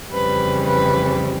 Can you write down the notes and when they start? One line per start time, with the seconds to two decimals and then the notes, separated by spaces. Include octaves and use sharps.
0.13 F2 C#3 E3 G3 C4 B4
0.66 B4